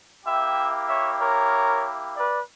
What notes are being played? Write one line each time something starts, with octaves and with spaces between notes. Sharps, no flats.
A#3 E4 G4 E5 G5
C#5 E5
A#4 C#5
B4 D5